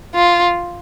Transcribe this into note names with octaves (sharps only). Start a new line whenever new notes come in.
F4